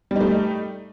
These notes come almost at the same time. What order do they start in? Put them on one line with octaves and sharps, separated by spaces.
G3 D#4 A3